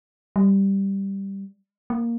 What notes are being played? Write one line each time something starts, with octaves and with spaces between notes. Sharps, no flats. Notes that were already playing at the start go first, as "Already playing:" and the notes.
G3
A#3